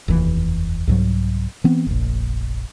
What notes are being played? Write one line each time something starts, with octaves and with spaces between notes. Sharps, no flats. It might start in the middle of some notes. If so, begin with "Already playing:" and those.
F1 D#2 E3
C2 G#2 F#3
E3 B3 C4
F1 A#1